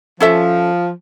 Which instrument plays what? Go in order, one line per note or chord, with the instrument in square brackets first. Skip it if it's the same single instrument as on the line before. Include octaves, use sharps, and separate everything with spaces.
[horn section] F3 [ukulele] C#4 A4 E5